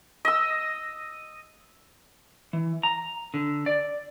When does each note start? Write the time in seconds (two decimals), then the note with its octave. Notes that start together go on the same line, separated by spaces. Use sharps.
0.25 D#5 E6
2.53 E3
2.83 A#5
3.34 D3
3.66 D5